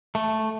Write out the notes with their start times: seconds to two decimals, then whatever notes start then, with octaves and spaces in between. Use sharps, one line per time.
0.15 A3